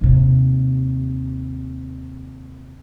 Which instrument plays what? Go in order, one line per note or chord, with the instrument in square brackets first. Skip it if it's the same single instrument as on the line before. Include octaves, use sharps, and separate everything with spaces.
[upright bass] D#2 C3